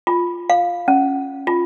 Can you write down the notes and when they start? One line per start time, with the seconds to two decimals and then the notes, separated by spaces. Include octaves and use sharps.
0.07 F4
0.50 F5
0.88 C#4
1.47 F4